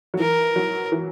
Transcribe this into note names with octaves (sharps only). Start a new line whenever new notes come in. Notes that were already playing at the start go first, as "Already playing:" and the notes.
F#3
E3 A#4
F#3
E3